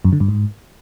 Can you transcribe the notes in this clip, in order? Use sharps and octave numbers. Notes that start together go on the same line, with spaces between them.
F#2
D3
G2
G#2